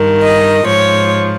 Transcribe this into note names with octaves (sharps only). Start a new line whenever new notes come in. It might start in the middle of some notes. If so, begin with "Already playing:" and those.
Already playing: G2 D#3
D#5
G#2 F3 C#5